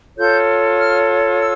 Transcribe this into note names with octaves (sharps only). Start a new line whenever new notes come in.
F4 A4 C#5 G6
F6
E6